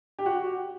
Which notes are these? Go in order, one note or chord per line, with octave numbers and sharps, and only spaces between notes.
G4
F#4